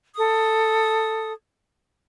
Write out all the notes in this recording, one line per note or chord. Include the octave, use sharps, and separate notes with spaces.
A4 D#6